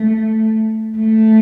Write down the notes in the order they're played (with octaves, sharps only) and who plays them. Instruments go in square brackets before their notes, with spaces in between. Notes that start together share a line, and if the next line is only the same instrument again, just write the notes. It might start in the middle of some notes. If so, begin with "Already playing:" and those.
Already playing: [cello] A3
A3